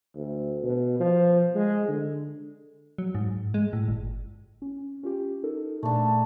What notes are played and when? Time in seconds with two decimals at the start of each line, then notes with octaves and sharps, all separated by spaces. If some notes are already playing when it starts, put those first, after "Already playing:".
0.16 D2
0.63 B2
1.00 F3
1.55 G#3
1.89 D3
2.98 F#3
3.15 G#2
3.54 G#3
3.73 A2
3.88 G1
4.62 C#4
5.03 C#4 F4 G4
5.43 D#4 A4 A#4
5.83 A#2 A3 D4